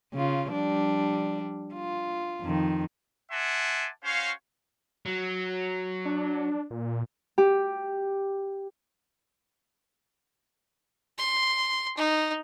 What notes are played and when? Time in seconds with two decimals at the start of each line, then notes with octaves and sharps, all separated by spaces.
0.14 C#3 F4
0.52 F3 G3 D4
1.74 F4
2.41 F2 D#3
3.32 E5 F#5 G#5 A5 C6 D6
4.04 C#4 F#4 C5 C#5 F5
5.06 F#3
6.05 D4
6.71 A#2
7.38 G4
11.18 C6
11.97 D#4